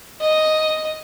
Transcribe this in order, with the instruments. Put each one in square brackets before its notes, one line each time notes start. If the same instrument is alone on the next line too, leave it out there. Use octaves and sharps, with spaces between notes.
[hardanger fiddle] D#5